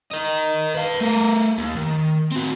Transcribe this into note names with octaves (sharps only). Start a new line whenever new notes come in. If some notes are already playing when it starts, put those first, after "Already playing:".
A#4 D#5
B4 F5
A3 A#4
D#2
D#3
C4 F#4